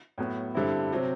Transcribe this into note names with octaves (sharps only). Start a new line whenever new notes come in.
A2 F#3 B3
G2 D3 G3 C4 E4
C3 F#3 C4